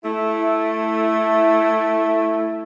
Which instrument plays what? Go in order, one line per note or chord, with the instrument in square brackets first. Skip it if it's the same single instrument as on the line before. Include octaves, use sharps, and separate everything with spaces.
[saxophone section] A3 E4